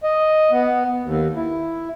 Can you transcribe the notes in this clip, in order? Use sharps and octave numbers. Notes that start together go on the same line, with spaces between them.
D#5
B3
D#2
E4